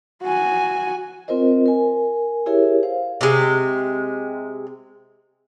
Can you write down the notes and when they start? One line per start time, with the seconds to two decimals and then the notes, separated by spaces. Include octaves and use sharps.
0.23 F#4 G#5
1.28 C4 F4 A#4 C5 D#5
1.66 A#4 G#5
2.46 E4 G4 G#4 A#4 C#5 E5
2.83 C5 F5
3.21 C3 G#3